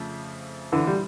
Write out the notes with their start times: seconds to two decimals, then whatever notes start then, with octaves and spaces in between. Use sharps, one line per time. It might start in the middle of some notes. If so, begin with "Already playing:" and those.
Already playing: F2 C#3 F3 A3
0.72 D3 E3
0.87 G3